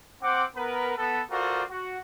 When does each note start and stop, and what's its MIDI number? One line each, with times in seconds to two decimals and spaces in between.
0.22 0.44 60
0.22 0.44 78
0.22 0.44 86
0.56 0.92 59
0.56 0.92 70
0.56 0.92 71
0.96 1.21 59
0.96 1.21 69
1.30 1.63 65
1.30 1.63 66
1.30 1.63 69
1.30 1.63 70
1.30 1.63 72
1.30 1.63 74
1.70 1.99 66